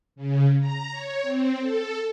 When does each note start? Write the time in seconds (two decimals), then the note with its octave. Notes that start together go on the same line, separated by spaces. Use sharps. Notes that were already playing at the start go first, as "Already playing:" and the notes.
0.16 C#3
0.60 A#5
0.91 C#5
1.23 C4
1.60 A4